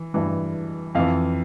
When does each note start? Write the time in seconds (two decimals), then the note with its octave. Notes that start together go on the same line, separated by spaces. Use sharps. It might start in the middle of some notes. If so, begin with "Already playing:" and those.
Already playing: E3
0.14 G2 E3
0.95 F2 E3 F5